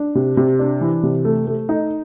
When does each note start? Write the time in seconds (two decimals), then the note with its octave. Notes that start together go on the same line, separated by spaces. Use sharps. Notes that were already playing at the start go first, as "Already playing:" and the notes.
Already playing: D4
0.15 C3
0.37 C3
0.59 D4
0.81 E3
1.03 C3
1.25 A3
1.47 A3
1.69 D#4